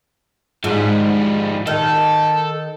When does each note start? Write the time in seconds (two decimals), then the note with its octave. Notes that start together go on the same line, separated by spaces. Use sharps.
0.64 G#2 F3 G3
1.67 D#3 A4